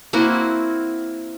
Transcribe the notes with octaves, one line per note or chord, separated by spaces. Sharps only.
A#3 C4 E4 F#4